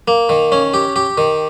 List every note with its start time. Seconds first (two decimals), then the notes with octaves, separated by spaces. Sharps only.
0.08 A#3
0.29 D#3
0.52 C#4
0.74 G4
0.96 G4
1.18 D#3